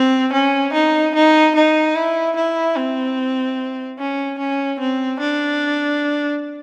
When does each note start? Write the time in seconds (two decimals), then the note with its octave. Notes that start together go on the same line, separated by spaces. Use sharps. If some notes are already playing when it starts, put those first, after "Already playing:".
Already playing: C4
0.33 C#4
0.73 D#4
1.15 D#4
1.55 D#4
1.95 E4
2.36 E4
2.76 C4
3.99 C#4
4.38 C#4
4.79 C4
5.20 D4